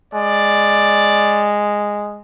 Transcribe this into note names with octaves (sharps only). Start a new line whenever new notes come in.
G#3 D5